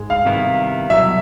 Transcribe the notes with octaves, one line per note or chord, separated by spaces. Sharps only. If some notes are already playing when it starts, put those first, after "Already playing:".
Already playing: G#2 G#3
F5
C3 D#3 G3 B3 E4
C2 B2 F#3 E5